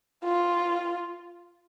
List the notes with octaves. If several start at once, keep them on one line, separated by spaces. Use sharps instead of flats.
F4